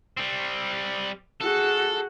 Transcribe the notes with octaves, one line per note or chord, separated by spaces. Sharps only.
G3 C4
F#4 G#4 A4